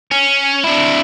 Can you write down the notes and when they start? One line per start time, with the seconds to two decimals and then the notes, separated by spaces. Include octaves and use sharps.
0.11 C#4
0.64 D4 E4